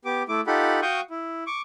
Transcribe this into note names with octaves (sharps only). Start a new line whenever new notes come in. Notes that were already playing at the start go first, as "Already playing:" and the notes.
B3 G4 D6
A3 E4 D6
D#4 F4 G4 A4 F#5 B5
F#4 F5 G5 C#6 D#6 G6
E4
C#6 D6